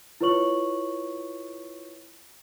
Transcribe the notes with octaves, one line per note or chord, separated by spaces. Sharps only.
E4 F4 B4 C#5 C#6 F#7